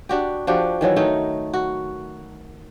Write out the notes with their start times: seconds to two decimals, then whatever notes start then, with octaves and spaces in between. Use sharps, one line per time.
0.09 D4 F#4 G4
0.47 F3 D4 F#4 G4
0.81 D#3 E3 F#3 E4
0.96 D#3 A3 D#4
1.54 F#4